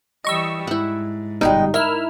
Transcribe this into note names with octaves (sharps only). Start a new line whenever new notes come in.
E3 G3 D#5 C#6 E6
G#2 E4 F#5
G1 B2 G3 G#3 D#4 G5
E4 A#4 E6 F6